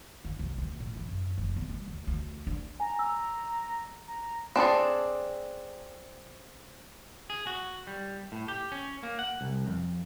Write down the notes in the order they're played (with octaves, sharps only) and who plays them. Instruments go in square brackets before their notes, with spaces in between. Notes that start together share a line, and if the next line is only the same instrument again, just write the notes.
[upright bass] D3
C2
D2
A2
E3
F#2
F1
B3
G3
D2
D2
D4
[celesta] G#5 [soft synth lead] A#5
[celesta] E6
[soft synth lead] A#5
[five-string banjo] C4 D4 G#4 A4
[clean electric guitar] G#4
F#4
G3
A2
G4
C#4
A#3
F#5
C2
F2